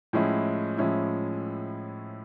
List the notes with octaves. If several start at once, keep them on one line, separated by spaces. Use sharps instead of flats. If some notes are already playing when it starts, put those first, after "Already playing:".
A2 F3 G#3 C#4 E4
A2 F3 G#3 C#4 E4